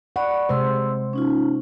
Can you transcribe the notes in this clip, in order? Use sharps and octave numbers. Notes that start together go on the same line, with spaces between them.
D5 F#5 B5 C#6
C3 G#3 C5 C6 E6
C#4 D#4 F4